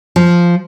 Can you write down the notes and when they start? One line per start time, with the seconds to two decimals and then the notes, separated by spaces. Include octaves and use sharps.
0.16 F3